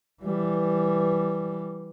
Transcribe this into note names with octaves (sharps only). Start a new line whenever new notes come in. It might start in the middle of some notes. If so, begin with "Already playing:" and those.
E3 G3